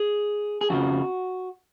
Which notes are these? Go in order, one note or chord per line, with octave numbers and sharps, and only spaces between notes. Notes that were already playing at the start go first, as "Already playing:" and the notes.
Already playing: G#4
G#4
F2 C#3 F3 F#4